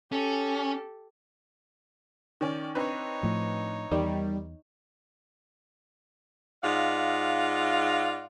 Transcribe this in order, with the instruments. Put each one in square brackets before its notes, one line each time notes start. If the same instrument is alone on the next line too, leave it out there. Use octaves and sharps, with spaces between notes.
[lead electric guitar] C#4 [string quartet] G4 A4
[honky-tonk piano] D#3 C#4 [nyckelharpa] D5
[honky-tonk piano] C4 D4 B4 [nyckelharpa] D#4 C#5
[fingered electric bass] A2 F3
[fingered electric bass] E2 [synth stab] D#3 G3
[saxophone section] G#2 F4 D5 D#5 F5 F#5